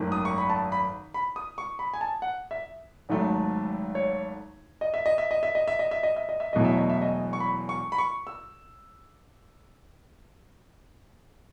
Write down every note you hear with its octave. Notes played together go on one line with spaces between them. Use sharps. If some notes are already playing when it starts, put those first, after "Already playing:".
Already playing: G#1 F#2 D#3 A3
D#6
C#6
B5
A5
B5
B5
D#6
C#6
B5
G#5
A5
F#5
E5
G#1 G#2 F#3 A3
C#5
D#5
E5
D#5
E5
D#5
E5
D#5
E5
D#5
E5
D#5
E5
D#5
E5
E1 E2 B2 F#3 A3 D#5
E5
D#5
E5
D#5
C#6
B5
C#6
B5
C#6
E6